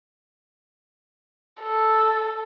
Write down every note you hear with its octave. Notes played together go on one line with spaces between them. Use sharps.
A4